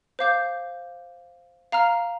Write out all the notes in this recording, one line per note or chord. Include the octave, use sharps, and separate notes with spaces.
C5 F5 D6 G6
F5 A#5 F6